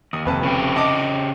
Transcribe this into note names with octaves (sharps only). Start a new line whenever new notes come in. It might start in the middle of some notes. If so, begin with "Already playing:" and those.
D#2 D#6
F1 B4 A5
C#3 G4
D#5 A5 D6